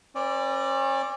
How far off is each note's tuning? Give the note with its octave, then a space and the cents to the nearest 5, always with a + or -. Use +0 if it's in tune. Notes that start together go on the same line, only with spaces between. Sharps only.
C#4 -35 B4 +0 D5 +0